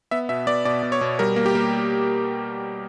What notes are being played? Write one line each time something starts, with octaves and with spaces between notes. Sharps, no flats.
B3 E5
B2 E5
B3 D5
B2 D5
B2
C#5
B2
G3 A#4
A#3
G4
A#3